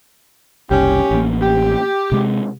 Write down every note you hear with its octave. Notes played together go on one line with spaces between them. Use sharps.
F#1 C2 C#4 G4
A1 A#3
G4
C3 G#3